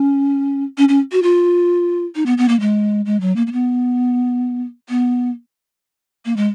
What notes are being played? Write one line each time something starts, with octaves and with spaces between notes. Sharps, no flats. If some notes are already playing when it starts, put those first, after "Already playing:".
Already playing: C#4
C#4
C#4
F#4
F4
D#4
B3
B3
A#3
G#3
G#3
F#3
A#3
A#3
B3
B3
A#3
G#3